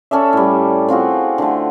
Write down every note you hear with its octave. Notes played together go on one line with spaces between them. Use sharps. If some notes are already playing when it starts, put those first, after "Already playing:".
C#4 A4 D5 E5
A2 G3
C4 F4 F#4 G#4
D3 A3